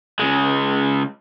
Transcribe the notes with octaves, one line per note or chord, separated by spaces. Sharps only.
C#3 G#3